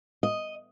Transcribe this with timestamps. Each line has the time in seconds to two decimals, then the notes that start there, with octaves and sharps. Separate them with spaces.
0.23 D#5